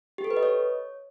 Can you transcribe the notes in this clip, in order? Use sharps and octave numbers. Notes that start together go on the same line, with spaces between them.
G4
A4
B4
D#5
C#5